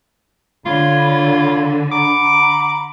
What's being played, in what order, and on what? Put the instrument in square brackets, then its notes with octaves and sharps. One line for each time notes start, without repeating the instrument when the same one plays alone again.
[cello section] D3 [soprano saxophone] F4 [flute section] C#5 B5 G#6
[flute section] F#5 A#5 B5 [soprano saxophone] D6